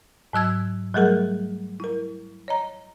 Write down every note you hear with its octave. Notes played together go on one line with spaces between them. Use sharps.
G#2 F#3 E6 G#6
F#3 G3 A3 G#4 A#4
E4 A#4
C#5 D#5 A#5